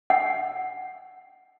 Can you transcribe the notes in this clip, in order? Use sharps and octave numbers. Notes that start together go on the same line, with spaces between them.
F#5